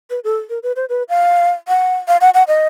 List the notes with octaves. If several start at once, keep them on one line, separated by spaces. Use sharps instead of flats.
B4
A4
A#4
B4
C5
B4
F5
F#5
F5
F#5
F#5
D#5